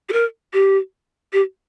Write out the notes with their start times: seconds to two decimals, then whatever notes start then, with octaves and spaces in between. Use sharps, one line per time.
0.09 G4
0.13 A#4
0.53 G4
1.33 G4